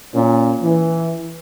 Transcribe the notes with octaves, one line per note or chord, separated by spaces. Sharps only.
A#2 C#4
E3